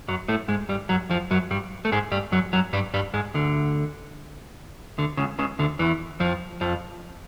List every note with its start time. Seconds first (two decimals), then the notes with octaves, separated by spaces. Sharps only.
0.08 F#2 F#3
0.28 A2 A3
0.48 G#2 G#3
0.69 G2 G3
0.89 F#2 F#3
1.09 F2 F3
1.31 F#2 F#3
1.51 G2 G3
1.85 A3
1.92 G#2 G#3
2.11 G2 G3
2.32 F#2 F#3
2.53 F#2 F#3
2.73 G2 G3
2.94 G2 G3
3.14 G#2 G#3
3.34 D2 D3
4.98 D2 D3
5.17 C#2 C#3
5.38 C#2 C#3
5.59 D2 D3
5.79 E2 E3
6.20 F2 F3
6.61 F2 F3